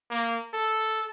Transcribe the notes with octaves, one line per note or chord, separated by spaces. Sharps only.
A#3
A4